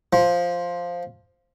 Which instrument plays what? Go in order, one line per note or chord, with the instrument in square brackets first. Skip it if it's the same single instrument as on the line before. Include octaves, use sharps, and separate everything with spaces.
[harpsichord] F3